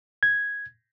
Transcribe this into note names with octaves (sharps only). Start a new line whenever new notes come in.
G#6